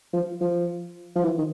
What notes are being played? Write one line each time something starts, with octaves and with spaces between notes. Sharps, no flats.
F3
F3
F3
E3
D#3